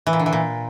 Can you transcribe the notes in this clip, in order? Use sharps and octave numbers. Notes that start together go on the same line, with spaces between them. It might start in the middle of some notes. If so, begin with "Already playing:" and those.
E3
A#2
D3
E3
A#2